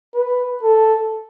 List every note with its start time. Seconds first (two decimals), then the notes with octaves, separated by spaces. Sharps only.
0.14 B4
0.62 A4